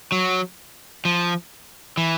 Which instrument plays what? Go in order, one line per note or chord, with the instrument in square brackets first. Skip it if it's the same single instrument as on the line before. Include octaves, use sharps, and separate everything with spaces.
[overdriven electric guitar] F#3
F3
E3